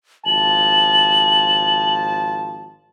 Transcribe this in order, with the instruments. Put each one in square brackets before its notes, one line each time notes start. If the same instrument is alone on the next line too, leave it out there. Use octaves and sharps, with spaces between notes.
[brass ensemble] G#1 F3 A5 [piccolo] F#7